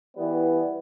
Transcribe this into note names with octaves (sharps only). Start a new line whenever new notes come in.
E3 G3 B3 B4